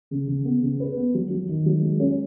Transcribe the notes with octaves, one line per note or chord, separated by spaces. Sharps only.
C#3
C#3
B3
C#3
B4
B3
F#3
F#3
D#3
F#3
G#3
C#4